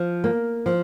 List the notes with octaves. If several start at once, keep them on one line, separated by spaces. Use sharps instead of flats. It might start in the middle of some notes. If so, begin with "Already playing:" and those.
Already playing: F3
A#3
F3